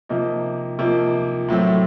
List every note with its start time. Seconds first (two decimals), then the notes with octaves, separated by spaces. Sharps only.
0.09 C3 F3 A#3 D#4
0.79 C3 F3 A#3 D#4
1.49 A2 F#3 A3 C4